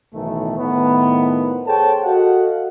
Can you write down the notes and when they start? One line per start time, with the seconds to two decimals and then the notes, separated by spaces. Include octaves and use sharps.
0.14 B1 A2 D#3 E3 A3
0.58 A2 D#3 F3 B3
1.67 G#4 A4 C5 C#5 G5 A5
2.04 F#4 A4 D#5 F5 F#5